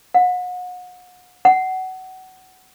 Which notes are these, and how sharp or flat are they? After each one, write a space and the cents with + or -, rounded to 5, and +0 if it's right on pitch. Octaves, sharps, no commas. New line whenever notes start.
F#5 -35
F#5 +25